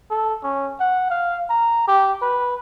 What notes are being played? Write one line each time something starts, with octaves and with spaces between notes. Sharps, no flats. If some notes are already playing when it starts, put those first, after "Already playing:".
A4
C#4
F#5
F5
A#5
G4
B4